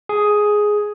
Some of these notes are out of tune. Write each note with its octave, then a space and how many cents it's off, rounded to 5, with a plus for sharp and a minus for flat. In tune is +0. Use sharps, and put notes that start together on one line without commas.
G#4 +5